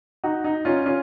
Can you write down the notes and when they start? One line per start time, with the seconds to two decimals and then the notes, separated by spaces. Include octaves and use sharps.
0.24 D#4 F#4
0.44 D#4
0.65 C#4 F4
0.86 C#4 F4